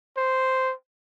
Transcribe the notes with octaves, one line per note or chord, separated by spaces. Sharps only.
C5